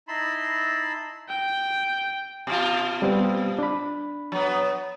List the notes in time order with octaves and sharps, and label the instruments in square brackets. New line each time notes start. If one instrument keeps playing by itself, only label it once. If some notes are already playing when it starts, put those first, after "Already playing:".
[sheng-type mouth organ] D#4 E4 A5 B5 C6
[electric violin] G5
[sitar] B2 F4
[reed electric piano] G3 B3 C4
D4 B5
[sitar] F#3 B3